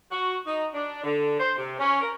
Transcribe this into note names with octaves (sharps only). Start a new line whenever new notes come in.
F#4
D#4
D4
D3
C5
C3
C#4
A#4